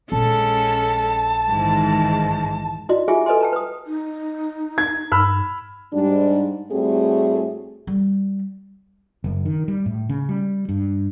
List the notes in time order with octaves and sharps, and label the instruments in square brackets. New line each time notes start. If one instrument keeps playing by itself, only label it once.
[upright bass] A#1 [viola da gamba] G#3 C#4 A4 [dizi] A5
[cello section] G#2 [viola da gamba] D#3 E3
[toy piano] E4 F#4 D5 D#5
E4 F4 G4 G#4 E5 G#5
A4 B4 D#5 G#5 C6
G5 A5 A#5
B4 D#6
[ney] D#4
[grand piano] G#6
[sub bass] G2 [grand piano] B5 E6 F6
[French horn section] G#2 G3 D4
A2 G3 A3 C4 F#4 G#4
[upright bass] G3
[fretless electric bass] F#1
D#3
G3
A2
C#3
G3
G2